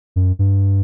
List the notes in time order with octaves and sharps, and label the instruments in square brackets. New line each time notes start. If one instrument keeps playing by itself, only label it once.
[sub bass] F#2
G2